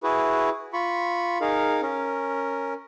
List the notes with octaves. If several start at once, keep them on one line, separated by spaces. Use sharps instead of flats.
E4 F#4 G#4 B4
F4 B5 C#6
D#4 G#4 A#4 F5
C#4 A#4